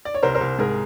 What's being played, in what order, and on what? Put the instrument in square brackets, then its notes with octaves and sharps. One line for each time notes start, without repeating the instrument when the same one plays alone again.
[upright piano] D5
C#5
C2 A#4 C5
A#4 C5
C2
G#2 G#4 A#4